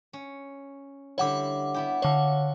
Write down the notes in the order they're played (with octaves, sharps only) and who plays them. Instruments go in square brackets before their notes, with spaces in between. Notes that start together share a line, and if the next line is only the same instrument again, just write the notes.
[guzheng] C#4
[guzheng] D3 G3 E4 [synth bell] C#5 F#5 D6
[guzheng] B3 E4 G4
[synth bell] D3 C#5 [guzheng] F#4 F5